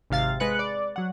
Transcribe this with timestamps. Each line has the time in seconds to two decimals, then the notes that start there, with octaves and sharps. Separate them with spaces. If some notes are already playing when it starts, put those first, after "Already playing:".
0.10 G#1 C3 F5 A6
0.40 G#3 B4 F#6 C#7
0.59 D5
0.96 F#3 F#5